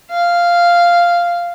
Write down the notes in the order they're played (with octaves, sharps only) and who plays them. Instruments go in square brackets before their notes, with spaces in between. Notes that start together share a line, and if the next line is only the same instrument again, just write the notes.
[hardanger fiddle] F5